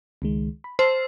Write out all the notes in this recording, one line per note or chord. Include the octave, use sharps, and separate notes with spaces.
C#2 D#3 G#3
B5
C5 A5 E6 F6